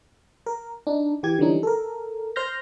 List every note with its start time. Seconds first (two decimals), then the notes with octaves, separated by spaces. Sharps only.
0.46 A#4
0.87 D4 D#4
1.23 E3 G4 G#6
1.38 D3 E3 F3 G3 C#4 D#4
1.63 A4 A#4
2.36 C5 C6 F6 G6 A#6